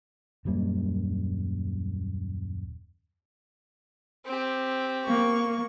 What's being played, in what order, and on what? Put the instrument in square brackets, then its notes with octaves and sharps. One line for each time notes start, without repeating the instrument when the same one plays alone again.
[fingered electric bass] D#1 F#2 G3 A#3
[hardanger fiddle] C4 G4
[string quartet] A#3 C#6